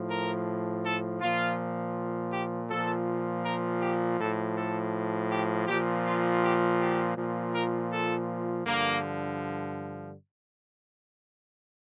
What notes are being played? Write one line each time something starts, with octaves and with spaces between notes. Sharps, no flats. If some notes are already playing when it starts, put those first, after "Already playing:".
Already playing: A2 F3
A#4
A4
A#2 F3 F4
G4
A#2 F3 A4
A#4
G4
A2 F3 A4
A4
G4
A#2 F3 G4
F4
G4
G4
A#2 F3
A#4
A4
G2 D3 F3 A#3